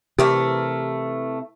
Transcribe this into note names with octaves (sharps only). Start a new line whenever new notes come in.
C3 E3 A3 G4 A#4